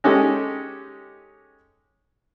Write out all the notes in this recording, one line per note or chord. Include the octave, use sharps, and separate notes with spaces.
G#3 C#4 D#4 G4 A4 D#5